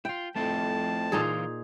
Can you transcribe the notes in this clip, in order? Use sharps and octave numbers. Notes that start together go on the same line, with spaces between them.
E4 F4 G5
F2 A3 C4 E4 A5
A#2 E3 D#4 F4 G#4